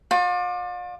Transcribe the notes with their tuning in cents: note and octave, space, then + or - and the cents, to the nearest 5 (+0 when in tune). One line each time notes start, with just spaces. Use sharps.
F4 +40 D5 +25